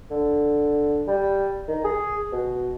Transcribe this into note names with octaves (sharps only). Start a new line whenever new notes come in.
D3
G3
D#3
G#4
B2